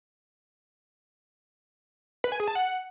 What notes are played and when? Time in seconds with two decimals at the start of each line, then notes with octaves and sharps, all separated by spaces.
2.24 B4
2.32 G#5
2.40 G#4
2.48 A5
2.55 F#5